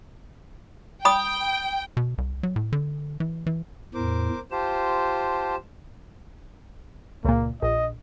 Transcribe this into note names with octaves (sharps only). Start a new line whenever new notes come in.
G5 B5 D#6
B2
C2
F#3
A2
D3
E3
E3
E2 A2 A#4 C5 D6
F4 G4 C5 A5
C#2 A#2 A#3
A#1 D#5